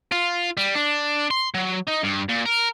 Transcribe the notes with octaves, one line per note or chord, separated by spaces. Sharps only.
F4
G3
D4
C6
F#3
D#4
G2
A#2
A#4